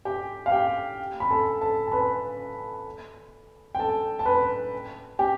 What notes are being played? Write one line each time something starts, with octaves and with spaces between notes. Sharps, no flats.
G4 G5
F5
G4 G5
B5
A4 A5
A4 A5
A5
B4 B5
G5
A4 A5
A5
B4 B5
G4 G5